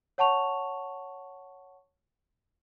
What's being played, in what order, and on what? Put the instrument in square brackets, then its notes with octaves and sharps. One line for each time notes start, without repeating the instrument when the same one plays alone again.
[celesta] C#5 F#5 A5 C#6 F7